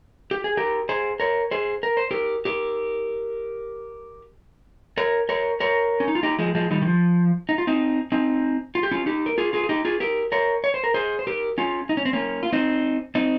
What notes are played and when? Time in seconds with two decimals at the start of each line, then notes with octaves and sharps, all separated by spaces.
0.31 G4
0.44 G#4
0.57 G4 A#4
0.89 G#4 C5
1.20 A#4 C#5
1.51 G#4 C5
1.83 A#4
1.97 C5
2.11 G4 A#4
2.45 G4 A#4
4.98 A#4 C#5
5.29 A#4 C#5
5.60 A#4 C#5
6.00 C#4
6.08 D#4
6.15 F4
6.23 D#4 G4
6.39 F3 G#3
6.55 F3 G#3
6.71 D#3 G3
6.82 D#3
6.87 F3
7.49 D#4
7.58 F4
7.67 C4 D#4
8.12 C4 D#4
8.75 F4
8.83 G4
8.91 C#4 F4
9.06 D#4 G4
9.26 A#4
9.38 F4 G#4
9.53 F4 G#4
9.64 G#4
9.69 D#4 G4
9.85 F4 G#4
10.00 G4 A#4
10.32 A#4 C#5
10.64 C#5
10.74 C5
10.84 A#4
10.94 G#4 C5
11.19 C5
11.27 G4 A#4
11.58 C#4 F4
11.89 D#4
11.97 C#4
12.05 C4
12.13 A#3 C#4
12.43 F4
12.53 C4 D#4
13.15 C4 D#4